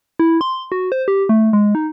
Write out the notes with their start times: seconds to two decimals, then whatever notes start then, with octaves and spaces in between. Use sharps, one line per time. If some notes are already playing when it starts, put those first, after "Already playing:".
0.19 E4
0.41 C6
0.72 F#4
0.92 C5
1.08 G4
1.29 A3
1.53 G#3
1.75 D#4